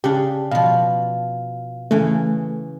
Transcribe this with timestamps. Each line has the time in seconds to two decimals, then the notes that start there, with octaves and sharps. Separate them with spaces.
0.04 C#3 D4 G4
0.51 B2 F3 F5
1.91 C#3 E3 A3